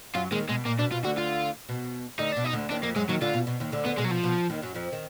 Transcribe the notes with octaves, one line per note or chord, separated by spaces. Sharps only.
F#2 F#3 F4
D#2 D#3 G#3
B2 G#3
A#2 A#3
B2 D4
B2 F4
D2 D3 F#4
F4
B2
D2 D3 D#4
B2 D4
D#4
D2 D3
D#2 D#3 D4
F2 F3 A#3
F#2 F#3 G#3
D#2 D#3 F#3
D2 D3 F4
B2
B2
D#2 D#3
D2 D3
D3 B3
B2 G#3
F#3
F3
B2
D#2 D#3
F#2 F#3
F2 F3
D#3